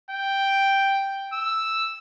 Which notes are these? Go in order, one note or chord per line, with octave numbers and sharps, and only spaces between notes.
G5
E6